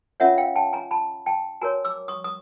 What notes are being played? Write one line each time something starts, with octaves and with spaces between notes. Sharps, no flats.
C#4 F4 A#4 C#5 E5 F#5
F5 G5
G5 A5
G#5 A#5
A5 B5
G5 A5
F#4 A#4 C#5 G#5 A#5
D6 E6
C#6 D#6
D#6